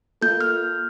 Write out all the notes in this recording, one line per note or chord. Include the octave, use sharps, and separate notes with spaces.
A#3 F4 A4 G6
F6